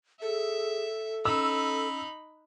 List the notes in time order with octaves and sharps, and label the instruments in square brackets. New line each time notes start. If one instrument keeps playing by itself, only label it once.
[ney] G#4 [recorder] A4 [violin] E5
[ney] C#4 [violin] D#4 B5 [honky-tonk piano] E6